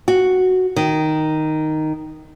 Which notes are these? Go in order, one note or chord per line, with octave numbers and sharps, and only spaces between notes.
F#4
D#3